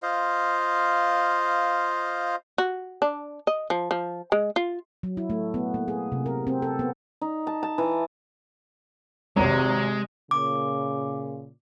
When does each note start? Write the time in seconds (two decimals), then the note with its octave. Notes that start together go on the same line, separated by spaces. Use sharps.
0.03 F4 C5 D#5 F5
2.58 F#4
3.02 D4
3.47 D#5
3.70 F3
3.91 F3
4.32 G#3
4.56 F4
5.03 F#3
5.17 E4
5.30 A3
5.54 B3
5.74 A#3
5.88 G#4
6.12 C3
6.26 A#4
6.47 C4
6.62 A4
6.79 B3
7.21 D#4
7.47 A5
7.63 A5
7.78 E3
9.36 G#1 C3 G#3 C#5 A#5
10.31 A#2 C#3 D6